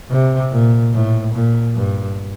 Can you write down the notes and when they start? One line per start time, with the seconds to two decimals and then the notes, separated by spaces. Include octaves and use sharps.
0.11 C3
0.52 A#2
0.94 A2
1.34 A#2
1.76 G2